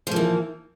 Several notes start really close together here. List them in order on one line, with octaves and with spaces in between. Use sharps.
F3 A#3 E3